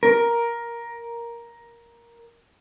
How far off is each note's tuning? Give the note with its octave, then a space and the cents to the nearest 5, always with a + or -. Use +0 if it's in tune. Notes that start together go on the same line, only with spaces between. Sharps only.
A#4 +10